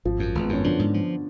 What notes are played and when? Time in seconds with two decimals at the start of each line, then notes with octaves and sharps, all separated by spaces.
0.05 G#1 F3
0.19 F#2
0.35 G#1
0.41 B3
0.49 F#2 C#4
0.64 D3 F3 D4
0.79 G#2
0.94 F3